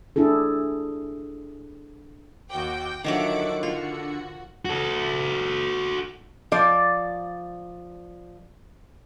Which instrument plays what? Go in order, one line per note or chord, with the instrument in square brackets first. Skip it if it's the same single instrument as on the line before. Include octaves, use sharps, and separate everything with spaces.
[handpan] D4 E4 G#4 A4
[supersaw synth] D#2 F#4 D6 [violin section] G5
[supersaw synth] D3 C#7 [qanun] D#3 F3 F#3 [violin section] E5 F#5 D6
[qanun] F4 [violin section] F#4
[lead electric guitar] F#4 A4
[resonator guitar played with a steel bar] F3 D5